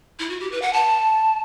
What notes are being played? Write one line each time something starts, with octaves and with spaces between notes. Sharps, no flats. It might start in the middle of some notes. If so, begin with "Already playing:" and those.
E4
F#4
G4
B4
F#5
A5